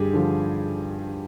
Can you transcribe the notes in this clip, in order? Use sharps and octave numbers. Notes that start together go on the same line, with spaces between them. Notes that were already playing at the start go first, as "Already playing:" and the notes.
Already playing: G2 D3 G4 G#4
D3 F3